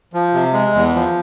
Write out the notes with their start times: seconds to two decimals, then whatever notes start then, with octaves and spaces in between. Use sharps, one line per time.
0.13 F3
0.34 C3
0.53 G#3
0.74 E2
0.95 F3